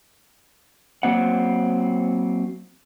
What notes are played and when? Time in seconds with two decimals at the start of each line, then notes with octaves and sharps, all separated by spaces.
1.03 F#3 A#3 C4 F#5